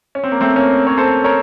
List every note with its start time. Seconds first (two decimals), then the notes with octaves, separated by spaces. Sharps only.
0.15 C#4
0.24 C4
0.32 A#3
0.41 A3 C4
0.56 A#3 C#4
0.87 C#5
0.97 A4 C5
1.24 A#4 C#5